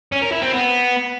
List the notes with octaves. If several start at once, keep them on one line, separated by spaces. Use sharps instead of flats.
C#4
A#4
E4
C4
B3